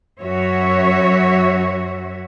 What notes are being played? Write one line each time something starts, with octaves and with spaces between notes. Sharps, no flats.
F#2 F#4 C#5 E5